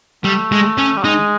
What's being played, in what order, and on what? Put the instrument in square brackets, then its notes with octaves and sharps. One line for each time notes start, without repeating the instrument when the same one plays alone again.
[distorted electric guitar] G3 [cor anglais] A3
[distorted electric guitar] G#3
C#4
[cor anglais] G3
[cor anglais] G#3 [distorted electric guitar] D#4